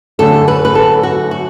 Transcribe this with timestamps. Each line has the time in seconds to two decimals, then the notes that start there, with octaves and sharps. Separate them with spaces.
0.19 F#2 D3 A3 A4
0.48 B4
0.65 B4
0.75 A4
1.03 F#4
1.31 F#4